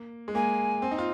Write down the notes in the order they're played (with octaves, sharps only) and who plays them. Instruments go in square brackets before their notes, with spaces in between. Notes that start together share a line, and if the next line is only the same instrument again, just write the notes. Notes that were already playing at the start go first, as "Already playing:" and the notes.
Already playing: [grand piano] A#3
G#3
[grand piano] A#3 [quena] G#5
[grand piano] C4
D#4
F4